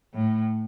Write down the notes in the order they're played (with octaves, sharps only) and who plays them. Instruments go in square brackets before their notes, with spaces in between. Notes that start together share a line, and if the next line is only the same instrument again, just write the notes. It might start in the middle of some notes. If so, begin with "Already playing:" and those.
[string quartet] A2